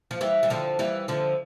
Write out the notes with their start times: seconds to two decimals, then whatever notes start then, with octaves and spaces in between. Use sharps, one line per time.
0.11 F3
0.21 E3 G3
0.43 G3
0.50 D3 F3
0.79 E3 G3
1.08 D3 F3